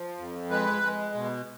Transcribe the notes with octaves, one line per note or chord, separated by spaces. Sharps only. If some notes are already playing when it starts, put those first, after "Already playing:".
Already playing: F3
F2
G#3 B4
G#3
B2